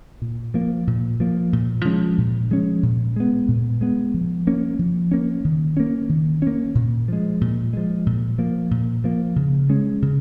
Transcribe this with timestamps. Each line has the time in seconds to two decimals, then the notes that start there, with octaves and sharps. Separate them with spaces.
0.22 A#2
0.54 F3 A#3
0.87 A#2
1.20 F3 A#3
1.53 A#2
1.85 F3 G#3 C#4
2.18 A#2
2.50 F3 G#3 C#4
2.83 A#2
3.16 G#3 B3
3.48 A#2
3.81 G#3 B3
4.14 F3
4.47 A#3 C#4
4.79 F3
5.11 A#3 C#4
5.45 D#3
5.77 A#3 C#4
6.09 D#3
6.42 A#3 C#4
6.75 A#2
7.08 F3 G#3
7.41 A#2
7.73 F3 G#3
8.06 A#2
8.38 F3 A#3
8.71 A#2
9.04 F3 A#3
9.36 C#3
9.70 G#3 C#4
10.02 C#3